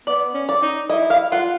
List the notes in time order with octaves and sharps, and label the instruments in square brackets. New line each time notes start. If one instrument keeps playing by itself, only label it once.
[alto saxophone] B3 [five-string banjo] D5
[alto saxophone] C#4
[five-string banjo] D5
[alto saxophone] D#4
[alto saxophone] E4 [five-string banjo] D#5
[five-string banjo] F5
[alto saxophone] F4 [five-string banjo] F#5